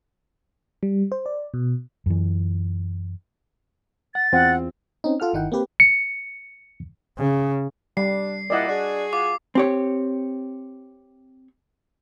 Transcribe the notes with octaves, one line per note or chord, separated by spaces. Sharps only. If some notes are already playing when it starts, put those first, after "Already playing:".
G3
C5
D5
B2
F#2 E3
F#5 A6
E2 C4 F4 F#5
C4 C#4 D#4
F4 A4 F#5 F6
G1 D#3 D#4 E4 F#5 G5
A#3 C4 G4 B4
C#7
C#3
G3 D4 C7
A#2 G3 A#3 E4 D5 D#5 F#5
D4 F#4 G#4
F4 D6
C4 G4 C#5